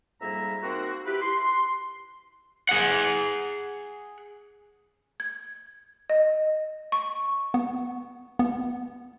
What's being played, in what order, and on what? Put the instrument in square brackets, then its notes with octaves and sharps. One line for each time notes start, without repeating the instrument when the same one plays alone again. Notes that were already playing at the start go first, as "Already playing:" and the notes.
[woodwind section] F2 G#2 G3 A#3 E5 A#5
A#3 C4 D#4 F#4
E4 G4 B4
C6
[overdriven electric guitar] G#4 F#5
[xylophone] G#6
D#5
C#6
[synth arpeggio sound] B3
B3